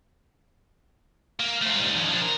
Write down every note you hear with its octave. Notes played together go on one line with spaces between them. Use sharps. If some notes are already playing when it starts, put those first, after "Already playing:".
A#3
A3 C4
G3 D#4
F3 C#4
F3 D4
A#4